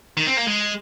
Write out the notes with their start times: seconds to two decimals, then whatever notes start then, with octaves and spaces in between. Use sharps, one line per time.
0.17 D#3
0.27 C4
0.37 A#3
0.47 G#3